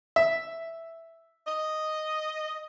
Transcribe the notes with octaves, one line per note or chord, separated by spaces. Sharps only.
E5
D#5